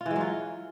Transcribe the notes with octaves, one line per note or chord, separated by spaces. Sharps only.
F4
E3
G#3
F#3
F4